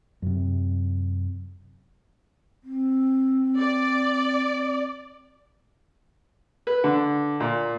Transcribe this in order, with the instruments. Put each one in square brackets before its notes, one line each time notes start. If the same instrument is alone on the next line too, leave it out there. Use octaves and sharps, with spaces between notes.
[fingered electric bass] F#2 C3
[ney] C4
[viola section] D5
[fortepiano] B4
D3
A#2